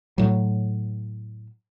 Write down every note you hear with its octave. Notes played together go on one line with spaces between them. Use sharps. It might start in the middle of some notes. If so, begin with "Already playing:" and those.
A2 F#3